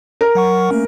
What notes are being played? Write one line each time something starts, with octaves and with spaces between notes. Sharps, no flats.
A#4
F#3 F#5 C#6
A3 A#3 C#4